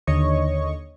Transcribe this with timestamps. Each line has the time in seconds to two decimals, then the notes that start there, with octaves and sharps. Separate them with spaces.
0.07 D#2 D3 C#5 D#5 C#6